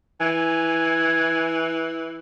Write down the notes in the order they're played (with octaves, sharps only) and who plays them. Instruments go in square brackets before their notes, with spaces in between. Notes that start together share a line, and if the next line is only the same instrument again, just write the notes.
[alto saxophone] E3 [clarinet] G#5